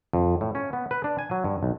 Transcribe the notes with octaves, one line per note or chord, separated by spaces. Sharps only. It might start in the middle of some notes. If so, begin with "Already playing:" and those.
F2
A2
C#4
B3
B4
D4
G#5
F#3
G2
B1